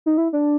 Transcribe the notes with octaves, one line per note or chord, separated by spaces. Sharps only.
D#4
E4
D4